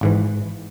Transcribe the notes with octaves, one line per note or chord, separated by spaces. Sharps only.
G#1 G#2 E3